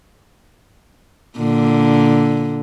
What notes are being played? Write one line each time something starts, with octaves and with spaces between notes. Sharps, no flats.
A#2 D3